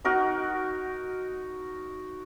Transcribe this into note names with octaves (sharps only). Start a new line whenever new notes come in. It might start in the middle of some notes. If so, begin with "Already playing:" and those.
D#4 F#4 A#4 D#5